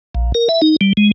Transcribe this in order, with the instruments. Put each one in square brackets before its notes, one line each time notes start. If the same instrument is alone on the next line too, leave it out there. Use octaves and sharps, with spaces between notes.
[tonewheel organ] A#1
A#4
E5
D#4
G3
G#3